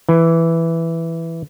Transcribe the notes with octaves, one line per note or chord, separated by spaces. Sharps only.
E3